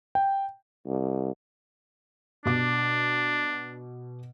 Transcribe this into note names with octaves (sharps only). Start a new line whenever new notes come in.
G5
C2
B2 D4 D6